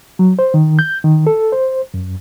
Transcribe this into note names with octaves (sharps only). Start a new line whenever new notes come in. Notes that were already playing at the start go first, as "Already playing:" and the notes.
F#3
C5
D#3
G6
D#3
A4
C5
F#2